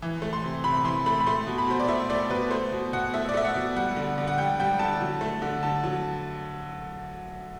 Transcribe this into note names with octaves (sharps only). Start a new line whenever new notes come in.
E3
A3
C6
C3
C3 B5
B5
E3 C6
A3 B5
B5
A3 C6
B2
B5
B2 C5
D5
A3 E5
A3 D5
B2 B4
A3 C5
B2
B2 F#5
A3 E5
D5
A3 E5
F#5
B2
G3 F#5
D3
D3
F#5
G3 G5
G3 G5
D3 A5
F#3
A3
D3
D3 A5
F#3